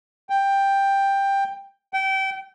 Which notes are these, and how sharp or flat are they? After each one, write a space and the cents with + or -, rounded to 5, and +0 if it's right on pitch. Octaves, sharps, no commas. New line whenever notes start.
G5 +10
G5 -25